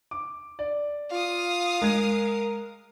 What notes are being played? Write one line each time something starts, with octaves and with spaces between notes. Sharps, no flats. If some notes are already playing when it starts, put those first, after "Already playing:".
D6
D5
F4 F5 D#6
G#3 A#4 G#6